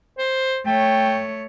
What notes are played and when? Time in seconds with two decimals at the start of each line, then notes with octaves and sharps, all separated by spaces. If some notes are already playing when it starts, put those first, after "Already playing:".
0.18 C5
0.66 A3 C#5 G5